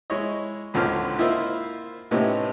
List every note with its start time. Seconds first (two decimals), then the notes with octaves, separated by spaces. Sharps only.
0.10 G#3 E4 C#5 D#5
0.74 G#1 C#2 D3 C4 C#5 F6
1.19 A#3 E4 F4 C5 D#5 E5
2.11 A2 C3 B3 C#4 D#4 E4